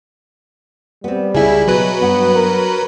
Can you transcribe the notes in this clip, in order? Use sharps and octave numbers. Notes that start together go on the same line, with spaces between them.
G3 B3 C4
C#2 E4 G#4 E5
B2 F#3 B4
G2 B3 F#5
A#4